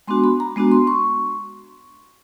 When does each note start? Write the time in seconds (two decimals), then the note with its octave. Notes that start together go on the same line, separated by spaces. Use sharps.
0.07 G#3 B3 D4 F#4 C6
0.24 B5
0.40 A#5
0.56 G#3 B3 D4 F#4
0.71 C6
0.87 C#6